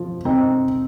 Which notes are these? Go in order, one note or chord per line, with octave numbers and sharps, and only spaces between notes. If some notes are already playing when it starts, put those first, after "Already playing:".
Already playing: F3
C4 D#4